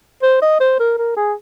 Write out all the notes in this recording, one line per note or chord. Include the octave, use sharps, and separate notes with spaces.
C5
D#5
C5
A#4
A#4
G#4